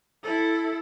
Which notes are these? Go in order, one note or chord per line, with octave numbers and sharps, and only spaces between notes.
E4 A4